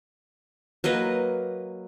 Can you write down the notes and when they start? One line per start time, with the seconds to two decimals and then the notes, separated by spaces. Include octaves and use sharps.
0.84 F#3 A#3 B4 D#5